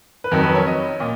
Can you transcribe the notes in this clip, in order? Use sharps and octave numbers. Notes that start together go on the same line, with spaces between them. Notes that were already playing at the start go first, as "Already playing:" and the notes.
B4
F2 D#3 F#3 A#4
B4
C#5
D#5
A#2 D#5